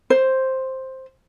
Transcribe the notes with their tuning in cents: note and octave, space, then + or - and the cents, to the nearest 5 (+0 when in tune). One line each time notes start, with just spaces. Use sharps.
C5 +5